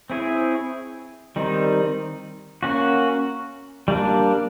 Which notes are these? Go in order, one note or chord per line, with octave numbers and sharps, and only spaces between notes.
C4 E4 G#4 C#5
D#3 G3 C4 D#4
A#3 C#4 F#4
G3 A#3 D4